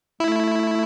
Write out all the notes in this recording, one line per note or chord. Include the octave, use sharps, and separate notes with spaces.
A3 E4